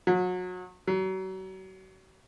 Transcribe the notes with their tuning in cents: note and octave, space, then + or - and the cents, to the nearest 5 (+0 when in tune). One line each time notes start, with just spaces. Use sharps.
F#3 -25
F#3 +40